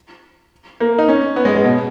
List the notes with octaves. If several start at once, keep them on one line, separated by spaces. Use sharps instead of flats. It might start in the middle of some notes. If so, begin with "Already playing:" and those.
A#3
D#4
C#4
B3
G#3
G#3
B2